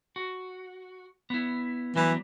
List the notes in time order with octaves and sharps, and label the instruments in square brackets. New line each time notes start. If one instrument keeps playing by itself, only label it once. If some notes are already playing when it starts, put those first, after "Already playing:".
[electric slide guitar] F#4
B3 E4
[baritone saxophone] E3 [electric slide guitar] F#3 G3 B3